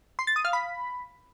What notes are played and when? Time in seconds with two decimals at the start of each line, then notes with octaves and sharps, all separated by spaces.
0.19 C6
0.27 A6
0.36 D#6
0.45 F5
0.53 B5